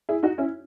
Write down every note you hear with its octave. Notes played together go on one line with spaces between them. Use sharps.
E4 G#4
D#4 F#4
C#4 E4